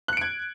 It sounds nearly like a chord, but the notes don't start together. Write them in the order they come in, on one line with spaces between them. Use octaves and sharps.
F#6 C#7 D7 G#6